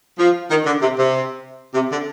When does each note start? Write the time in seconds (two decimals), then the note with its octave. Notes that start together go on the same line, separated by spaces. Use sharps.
0.18 F3
0.50 D#3
0.66 D3
0.81 C3
0.97 C3
1.74 C3
1.91 D3